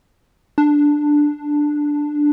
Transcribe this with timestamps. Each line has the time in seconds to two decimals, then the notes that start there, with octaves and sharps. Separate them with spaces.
0.58 D4